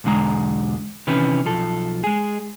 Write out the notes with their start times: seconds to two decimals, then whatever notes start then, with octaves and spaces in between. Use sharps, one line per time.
0.04 B1 E2 D3 G#3 A#5
1.07 C3 D#3 E3 C#4 B4
1.45 B1 F3 A4
2.04 G#3 G#4